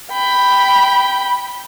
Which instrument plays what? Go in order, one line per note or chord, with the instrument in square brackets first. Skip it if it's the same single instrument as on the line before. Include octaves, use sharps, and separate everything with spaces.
[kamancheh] G5 B5